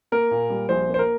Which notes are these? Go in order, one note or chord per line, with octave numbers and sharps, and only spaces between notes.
A#3 A#4
A#2
G3
A#1 C5
A#3 C5
A#4